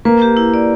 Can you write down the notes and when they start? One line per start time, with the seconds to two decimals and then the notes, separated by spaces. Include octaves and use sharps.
0.05 A#3 B4
0.22 G4
0.37 E4
0.54 D5